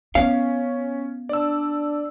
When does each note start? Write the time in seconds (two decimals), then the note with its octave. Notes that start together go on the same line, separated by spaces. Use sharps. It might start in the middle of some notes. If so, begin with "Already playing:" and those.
0.15 B3 C#4 C#5 F5
1.29 D4 D5 A5 E6